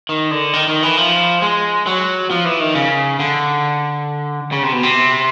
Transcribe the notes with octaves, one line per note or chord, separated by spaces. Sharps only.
D#3
D3
D#3
D#3
E3
F3
G#3
F#3
F3
E3
D#3
C#3
D3
C#3
C3
B2
C3